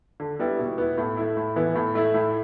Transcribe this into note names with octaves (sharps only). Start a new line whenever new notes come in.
D3
G3 B3 E4
B2
B3 E4
A2
A3 E4
A2
E3 B3 E4
A2
A3 E4
A2